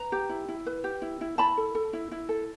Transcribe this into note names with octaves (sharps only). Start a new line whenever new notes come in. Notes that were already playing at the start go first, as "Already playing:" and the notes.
Already playing: B4 A#5
G4
E4
E4
B4
G4
E4
E4
E4 A5 B5
A4
A4
E4
E4
A4